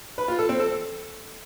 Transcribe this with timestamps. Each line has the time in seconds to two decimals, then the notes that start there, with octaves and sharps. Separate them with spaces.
0.18 B4
0.28 F4
0.39 A4
0.49 C4
0.59 A4